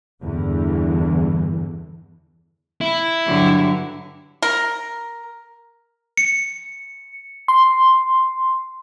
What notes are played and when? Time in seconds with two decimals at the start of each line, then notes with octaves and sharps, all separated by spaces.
0.23 E2 G2 D3 E3
2.81 E4
3.26 G2 D3 F#3
4.42 A#4
6.17 C#7
7.48 C6